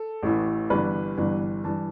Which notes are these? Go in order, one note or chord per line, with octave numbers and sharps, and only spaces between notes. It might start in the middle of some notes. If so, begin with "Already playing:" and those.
Already playing: A4
A1 A2 E3
G1 G2 E3 B4
G1 G2 E3
G2 E3 A5